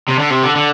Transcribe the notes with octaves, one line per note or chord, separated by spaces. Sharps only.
C3
D3
C3
D3
D3